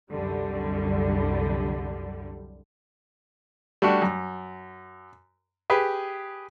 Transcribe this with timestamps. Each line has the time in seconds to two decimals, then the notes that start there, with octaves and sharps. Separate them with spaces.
0.11 C2 F#2 D3 G3
3.82 G3 A3 D4 F#4
4.02 F#2
5.70 G4 G#4 B4